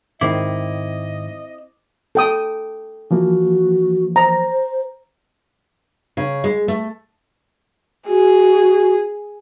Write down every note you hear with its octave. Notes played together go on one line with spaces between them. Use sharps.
G#2 D#3 C4 E4 D#5 D6
A4 G5 D#6
E3 F3 A#3 F#4
C5 A#5
C#3
G#3
A3
F#4 G#4